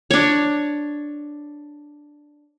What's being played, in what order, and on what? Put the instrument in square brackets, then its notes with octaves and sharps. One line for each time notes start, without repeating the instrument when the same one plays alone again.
[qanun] D4 C#5